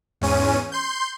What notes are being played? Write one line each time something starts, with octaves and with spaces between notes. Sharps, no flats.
E2 G#2 C#4 D#7
C6 G6